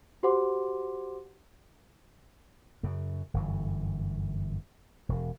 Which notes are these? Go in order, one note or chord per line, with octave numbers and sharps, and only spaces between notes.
F#4 G4 C5 F#5 C6 D6
F#2 C#3
G1 F#2 E3
E1